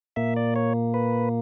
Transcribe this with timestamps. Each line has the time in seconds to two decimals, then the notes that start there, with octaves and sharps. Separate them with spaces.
0.16 A#2 A#3 E5
0.36 D5
0.56 C#5
0.94 B4